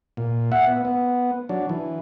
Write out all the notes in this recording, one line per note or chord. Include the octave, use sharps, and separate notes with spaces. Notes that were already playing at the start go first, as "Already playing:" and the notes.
A#2
E5 F#5
B3
B3
F#3 D4
E3